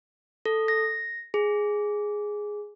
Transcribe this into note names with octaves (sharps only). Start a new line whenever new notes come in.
A4
A#6
G#4